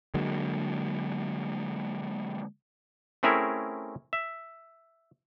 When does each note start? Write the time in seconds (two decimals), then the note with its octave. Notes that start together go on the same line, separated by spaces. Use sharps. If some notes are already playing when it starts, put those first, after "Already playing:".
0.14 D3 F#3 G#3 A#3
3.23 A3 C4 C#4 E4 G#4 A#4
4.13 E5